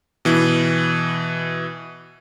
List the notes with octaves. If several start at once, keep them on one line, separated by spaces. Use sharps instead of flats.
B2 E3